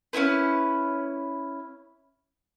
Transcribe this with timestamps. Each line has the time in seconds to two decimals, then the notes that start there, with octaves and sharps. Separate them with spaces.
0.13 C#4 D4 E4 B4